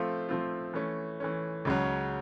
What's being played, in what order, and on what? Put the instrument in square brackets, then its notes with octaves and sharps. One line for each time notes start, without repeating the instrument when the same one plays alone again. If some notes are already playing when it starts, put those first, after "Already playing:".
Already playing: [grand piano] F3 A3 C4 F4
F3 A3 C4 F4
E3 A3 C#4
E3 A3 C#4
C#2 C#3 F#3